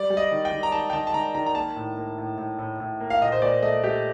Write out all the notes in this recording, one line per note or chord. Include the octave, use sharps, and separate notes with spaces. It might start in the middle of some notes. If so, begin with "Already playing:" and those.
Already playing: G3 D5
G3
D#5
D#3
G5
D#3
A#5
D#3 A5
G5
D#3 A5
A5
D#3 A#5
D#3 A#5
A#5
A#3 A5
A2
A#3
A2
A2
A2
A2
A#3
F5
A#2 D#5
C5
A#2 D5
A3 D#5
A3 G4